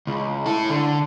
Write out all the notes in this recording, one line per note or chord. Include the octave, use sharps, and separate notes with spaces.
C#2
E4 A4
D3